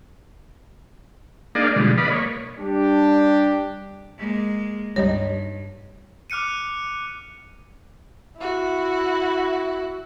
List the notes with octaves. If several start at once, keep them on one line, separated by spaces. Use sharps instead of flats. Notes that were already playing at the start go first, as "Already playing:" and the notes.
A#3 D4 D#4 G#4 D5 F5
B2 D3 F3 G3 G#3
B4 D5 D#5 F5 B5
A#3 C#5
G3 D4 G4
G#3 A#3
C#2 G2 G3 D#4 C#5
D6 F6 F#6 C#7 D#7
E4 F#4